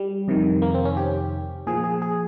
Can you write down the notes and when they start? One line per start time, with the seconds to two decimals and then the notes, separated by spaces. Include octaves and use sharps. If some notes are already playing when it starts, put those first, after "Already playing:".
Already playing: G3
0.28 F2 C3 D#3
0.62 A#3
0.74 C4
0.85 C#4
0.97 G4
1.67 A#2 F3 G#4
1.84 G#4
2.02 G#4